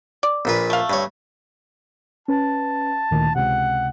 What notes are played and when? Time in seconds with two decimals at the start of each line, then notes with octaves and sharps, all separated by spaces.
0.23 D5
0.45 A#1 A#2 B4
0.70 A3 F5
0.90 G2 C#5
2.28 C#4 B4 A5
3.11 D2 A#2 D#3
3.35 C#2 C3 F#5